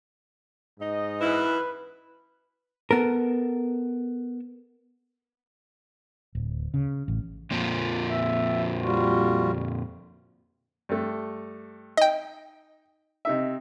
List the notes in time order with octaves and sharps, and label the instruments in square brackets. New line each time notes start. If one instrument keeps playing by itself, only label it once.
[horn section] G#2 D#4 D#5
[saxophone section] F#2 E3 E4 [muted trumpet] B4
[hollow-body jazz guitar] B3 A4 A#4
[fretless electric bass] D1
C#3
A1
[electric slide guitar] F2 A#2 F3
[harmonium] E5
G3 F4 F#4
[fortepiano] G2 A3
[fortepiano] D#4 [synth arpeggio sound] D#5 G5
[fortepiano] C3 D#4 E5